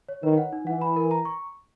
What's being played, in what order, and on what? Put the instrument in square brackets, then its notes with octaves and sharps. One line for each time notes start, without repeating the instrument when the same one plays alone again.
[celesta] C#5
[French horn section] D#3 [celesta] B4
[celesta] F#5
D#4
[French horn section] E3 [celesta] F#5
[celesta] B5
A#4
A#5
C#6